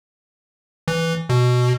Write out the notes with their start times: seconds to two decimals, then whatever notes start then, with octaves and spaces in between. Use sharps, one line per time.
0.88 E3
1.29 B2